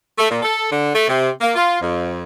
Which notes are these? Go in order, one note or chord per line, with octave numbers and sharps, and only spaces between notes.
A3
A#2
A4
D3
A3
C3
A#3
F4
F2